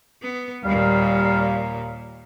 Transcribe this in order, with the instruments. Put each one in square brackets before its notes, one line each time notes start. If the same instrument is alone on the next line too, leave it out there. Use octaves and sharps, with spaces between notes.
[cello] B3
[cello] D#2 A#2 [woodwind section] G3 F5